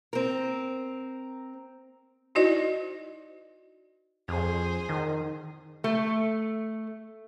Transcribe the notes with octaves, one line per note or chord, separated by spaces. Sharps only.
C4 A#4
D#4 E4 F#4 C5 D5 D#5
F2 G#4 C5
D#3
A3